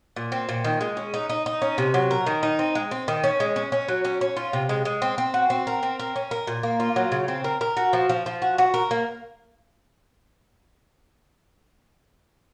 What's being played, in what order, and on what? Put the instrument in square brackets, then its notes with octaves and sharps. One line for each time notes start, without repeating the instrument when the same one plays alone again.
[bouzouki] A#2
C4
A#2
D#3
G#3
C#4
D#4
D#4
D#4
C#4
C3
F#3
A#4
D#3
D#4
C4
G#3
C4
D#3
C#4
G#3
C#4
C#4
F#3
C#4
C#4
F4
C3
G#3
G#3
C4
C4
F#4
C4
A#4
C4
A#4
C#4
A#4
A#2
A#3
F4
F#3
C#3
C4
A#4
A#4
F#4
F3
F3
F3
F#4
F#4
A#4
A#3